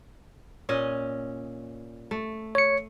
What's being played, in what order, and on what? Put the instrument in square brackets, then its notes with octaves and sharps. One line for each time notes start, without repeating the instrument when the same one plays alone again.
[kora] A#2 C#4 D#5
A3
[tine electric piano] C#5 C#7